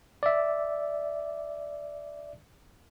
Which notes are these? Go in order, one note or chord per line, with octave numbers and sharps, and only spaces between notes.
D5 E5